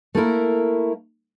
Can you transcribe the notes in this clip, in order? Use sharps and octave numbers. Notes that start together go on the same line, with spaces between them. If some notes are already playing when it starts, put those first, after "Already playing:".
A3 A#3 E4 A#4